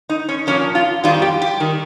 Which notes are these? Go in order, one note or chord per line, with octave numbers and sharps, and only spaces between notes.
D#4
C#4
A#2 F3 A#3 C#4
F4
F2 D#3 G3 F4
G4
G4
D#3 G3